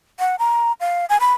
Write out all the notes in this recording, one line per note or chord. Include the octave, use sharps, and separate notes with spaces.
F#5
A#5
F5
G#5
B5